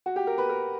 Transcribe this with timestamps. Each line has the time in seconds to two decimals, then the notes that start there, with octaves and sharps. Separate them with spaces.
0.06 F#4
0.16 G4
0.27 A#4
0.38 B4
0.49 A#4